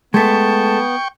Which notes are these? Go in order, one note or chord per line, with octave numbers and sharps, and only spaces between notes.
G#3 A3 B3 G5 A5 C#6